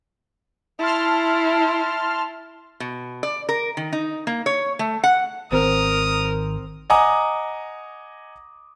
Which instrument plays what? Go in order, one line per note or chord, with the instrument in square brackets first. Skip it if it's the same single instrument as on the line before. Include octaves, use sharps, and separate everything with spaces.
[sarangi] E4 [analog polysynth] A5 C6 F6
[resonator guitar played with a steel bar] B2
D5
A#4
D#3
D#4
A#3
C#5
A3
F#5
[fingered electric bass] G#1 D#3 [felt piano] C4 C5 [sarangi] A#4 [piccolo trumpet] D#6
[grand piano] D#5 F#5 G#5 A#5 D6 D#6